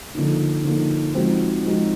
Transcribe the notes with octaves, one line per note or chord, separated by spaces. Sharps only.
D3 F3 A#3 D#4
D3 F3 A#3 D#4
F3 G#3 C4 D#4 F#4
F3 G#3 C4 D#4 F#4